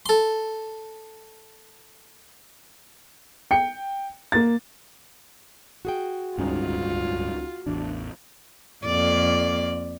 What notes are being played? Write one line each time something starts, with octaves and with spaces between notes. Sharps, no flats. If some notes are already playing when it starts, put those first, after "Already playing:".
A4 C6
G5 C#7
A#3 A6
F#4 G#4 G5
D1 C#2 G2 G#3 C#4 D#4 F4
A1 E2 D4
F2 A#3 D5